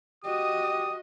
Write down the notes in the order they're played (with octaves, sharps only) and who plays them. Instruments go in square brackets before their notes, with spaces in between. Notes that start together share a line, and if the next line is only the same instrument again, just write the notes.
[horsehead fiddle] F#4 D#5 [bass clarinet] G4 [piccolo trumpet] D#6